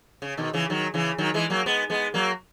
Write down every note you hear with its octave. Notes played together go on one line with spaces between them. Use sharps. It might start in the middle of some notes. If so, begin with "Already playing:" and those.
C#3
B2 D#3
C#3 E3
D#3 F#3
C#3 E3
D#3 F#3
E3 G#3
F#3 A#3
G#3 B3
G#3 B3
F#3 A#3